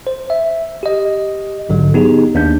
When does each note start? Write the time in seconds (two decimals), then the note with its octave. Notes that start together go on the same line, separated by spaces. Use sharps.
0.07 C5
0.30 E5
0.83 G4 D#5
1.69 A#1 G#2 D3 F#3
1.94 B3 D#4 G4 G#4
2.35 D#2 D4 G6